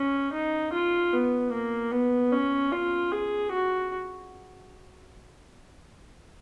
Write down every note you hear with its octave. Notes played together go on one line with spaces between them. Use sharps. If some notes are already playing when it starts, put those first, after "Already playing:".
Already playing: C#4
D#4
F4
B3
A#3
B3
C#4
F4
G#4
F#4